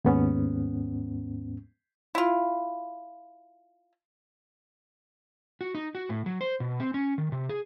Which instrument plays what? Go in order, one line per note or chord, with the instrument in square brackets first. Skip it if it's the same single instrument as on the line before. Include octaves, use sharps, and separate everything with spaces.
[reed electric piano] D#2 G#2 B3 C#4
[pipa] E4 F4
[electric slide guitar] F#4
D#4
F#4
A2
F#3
C5
B2
C4
C#4
D#3
C3
G#4